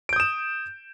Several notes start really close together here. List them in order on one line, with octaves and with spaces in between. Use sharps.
D7 G6 D#6 E7